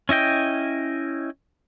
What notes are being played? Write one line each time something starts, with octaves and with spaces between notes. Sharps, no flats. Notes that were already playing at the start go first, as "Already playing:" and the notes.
C#4 E4 D#5 G5